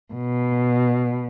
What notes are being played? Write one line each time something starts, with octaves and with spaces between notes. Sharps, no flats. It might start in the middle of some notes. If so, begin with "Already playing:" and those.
B2